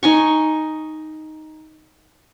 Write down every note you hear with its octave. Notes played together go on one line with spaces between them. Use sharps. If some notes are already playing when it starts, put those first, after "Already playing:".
D#4 G#5 C#6